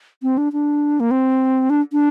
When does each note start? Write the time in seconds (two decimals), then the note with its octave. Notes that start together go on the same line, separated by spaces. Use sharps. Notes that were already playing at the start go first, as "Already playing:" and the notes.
0.23 C4
0.38 D4
0.53 D4
1.00 A#3
1.11 C4
1.70 D4
1.93 D4